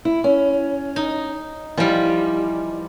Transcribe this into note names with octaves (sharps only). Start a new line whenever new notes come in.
E4
C#4
D#4
E3 F3 G3 D#5